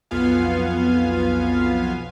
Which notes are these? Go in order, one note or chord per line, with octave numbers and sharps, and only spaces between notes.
B1 F2 B3 F4 F5 G#5